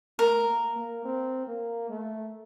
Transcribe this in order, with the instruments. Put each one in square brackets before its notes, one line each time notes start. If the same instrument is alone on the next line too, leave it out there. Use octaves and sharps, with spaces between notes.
[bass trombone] A3 [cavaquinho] A#4
[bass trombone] A#3
A#3
C4
A#3
A3